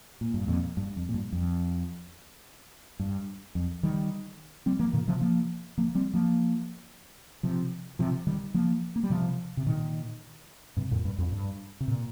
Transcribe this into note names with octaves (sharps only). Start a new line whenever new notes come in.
A#2
G2
F2 A#2
G2
F2
A#2
G2
F2
G2
F2
D#3 G3
G3 C4
F3 A#3
A#2 D#3
C3 F3
F3 A#3
F3 A#3
G3 C4
F3 A#3
C3 F3
C3 F3
D#3 G3
F3 A#3
A#3
G3
C3 F3
C3
A#2 D#3
G2 C3
F2 A#2
G2
F2
G2
C3
A#2